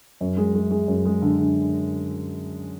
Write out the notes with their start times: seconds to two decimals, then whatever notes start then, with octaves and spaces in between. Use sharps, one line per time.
0.21 F#2
0.37 G#3
0.55 G#3
0.71 G#3
0.88 F#2
1.05 G#3
1.22 D3
1.38 D3